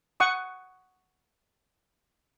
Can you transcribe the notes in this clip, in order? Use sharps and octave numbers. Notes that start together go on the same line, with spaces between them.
F#5 C#6 D#6